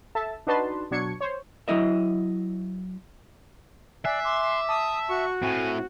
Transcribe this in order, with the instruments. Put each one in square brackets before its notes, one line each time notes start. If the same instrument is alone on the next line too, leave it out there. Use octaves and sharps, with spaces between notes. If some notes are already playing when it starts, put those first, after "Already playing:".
[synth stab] A4 E5 A5
D4 D#4 F#4 B4 A5 C6
B2 F#3 D4 C#6 G#6 C#7
C5 C#5
[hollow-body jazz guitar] F#3 E4 D#5 E5
[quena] D5 [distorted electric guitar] E5 [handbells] G#5 F#6 C7
[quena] C6 [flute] D6
[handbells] A5 [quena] D#6
[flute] F#4 [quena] C#6
[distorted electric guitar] A2 [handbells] C4 [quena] G#5